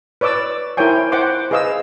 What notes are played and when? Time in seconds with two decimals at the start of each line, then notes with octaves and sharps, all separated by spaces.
0.21 B4 C#5 D5 D6 E6
0.77 E4 A#4 C5 C#5 G5 G#5
1.12 C5 F#5 G5 C6 D6
1.51 G#4 B4 D#5 F5 G#5 E6